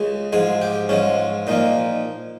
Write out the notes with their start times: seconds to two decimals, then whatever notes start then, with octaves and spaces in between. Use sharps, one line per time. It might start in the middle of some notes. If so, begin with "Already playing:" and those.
Already playing: C#2 C#3 G#3
0.33 G#2 F3 G#3 G#4
0.62 G4
0.89 G#2 F3 G#3 C#4
1.47 A#2 F3 A#3 D#4